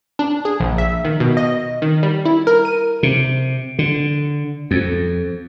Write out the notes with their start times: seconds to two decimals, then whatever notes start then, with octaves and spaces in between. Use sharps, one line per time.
0.19 D4
0.45 G#4
0.60 A#1
0.78 E5
1.05 D#3
1.20 B2
1.37 D#5
1.82 D#3
2.03 G3
2.25 E4
2.47 A#4
2.65 D#7
3.03 C3
3.79 D3
4.71 F2